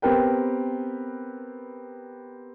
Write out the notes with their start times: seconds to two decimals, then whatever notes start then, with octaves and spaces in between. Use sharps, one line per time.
0.02 B3 C4 G4 A#4 B4 G5